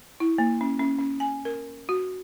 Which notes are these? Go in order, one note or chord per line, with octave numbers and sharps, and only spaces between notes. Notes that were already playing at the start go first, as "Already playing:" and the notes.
E4
A#3
C#4
C#4
C#4
G#5
A#4
F#4